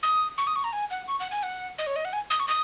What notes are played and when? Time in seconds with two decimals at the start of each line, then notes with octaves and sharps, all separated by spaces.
0.03 D#6
0.38 C#6
0.47 D#6
0.56 C#6
0.64 A#5
0.73 G#5
0.91 F#5
1.08 C#6
1.20 F#5
1.32 G#5
1.43 F#5
1.78 D#5
1.87 C#5
1.96 D#5
2.05 F#5
2.13 G#5
2.30 D#6
2.40 C#6
2.48 D#6